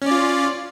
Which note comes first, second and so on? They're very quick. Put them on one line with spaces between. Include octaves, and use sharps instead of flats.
C#4 D5 F4